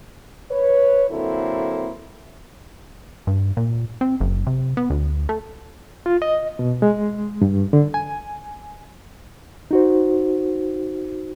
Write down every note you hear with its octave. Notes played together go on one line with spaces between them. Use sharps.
B4 C#5
D3 F#3 A#3 C4 E4 A4
G2
A#2
C4
F#1
C3
B3
D2
A3
F4
D#5
B2
G#3
G2
D3
G#5
D#4 F#4 C5